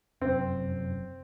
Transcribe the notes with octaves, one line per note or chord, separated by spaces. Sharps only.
F1 F#2 C4